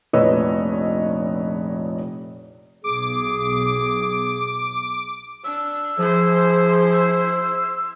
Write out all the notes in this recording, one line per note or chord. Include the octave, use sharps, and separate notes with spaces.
F1 A#1 B4 C#5 D#5 E6
B1 G#4 D6
D4 E6
F3 E4 G#4 C5
E6